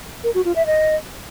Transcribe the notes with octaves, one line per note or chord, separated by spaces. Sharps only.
A#4
F#4
F4
E5
D#5